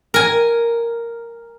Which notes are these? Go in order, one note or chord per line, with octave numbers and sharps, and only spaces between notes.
A#4 G#5